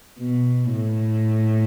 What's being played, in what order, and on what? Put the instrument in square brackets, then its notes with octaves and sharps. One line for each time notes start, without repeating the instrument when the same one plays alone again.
[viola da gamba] B2
A2